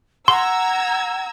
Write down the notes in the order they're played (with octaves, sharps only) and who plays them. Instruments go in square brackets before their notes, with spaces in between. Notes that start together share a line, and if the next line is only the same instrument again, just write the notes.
[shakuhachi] F#5 [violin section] A#5 E6 G#6 [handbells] C6